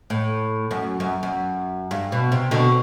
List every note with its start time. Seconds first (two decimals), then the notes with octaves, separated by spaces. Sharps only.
0.10 A2
0.71 F#2
1.00 F#2
1.23 F#2
1.91 G2
2.12 B2
2.32 C3
2.51 B2 D3